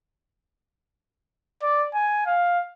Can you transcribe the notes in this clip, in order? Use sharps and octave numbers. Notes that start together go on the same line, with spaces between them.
D5
G#5
F5